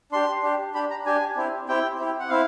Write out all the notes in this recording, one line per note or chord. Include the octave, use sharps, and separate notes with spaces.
D4 G4 C6
D4 G4
D4 G4 B5
A#5
D4 G4 G#5
C4 E4 G4
C4 E4 G4 G5
C4 E4 G4
F#5
C4 E4 F5